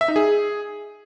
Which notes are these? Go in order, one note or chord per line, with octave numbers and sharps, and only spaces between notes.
E5
D#4
G#4